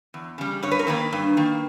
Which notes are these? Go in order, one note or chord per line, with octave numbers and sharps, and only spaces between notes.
E2
C#3 G3
G2 C#5
B4
A#4
D#3 A#3 B4
G2
D#3 A#3